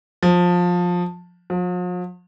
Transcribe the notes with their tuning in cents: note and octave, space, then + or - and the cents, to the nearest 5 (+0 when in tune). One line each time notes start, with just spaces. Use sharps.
F3 +20
F3 +45